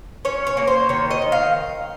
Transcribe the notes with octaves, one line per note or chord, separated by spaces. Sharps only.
C#4 C#5
C#5
A#3
C5
D#3 C#5
D#5
D#3
F5